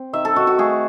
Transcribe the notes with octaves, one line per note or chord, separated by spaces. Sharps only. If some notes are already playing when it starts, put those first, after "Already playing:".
Already playing: C4
D#3 E5
A4
D#3 F#4
F#4
A3 G#4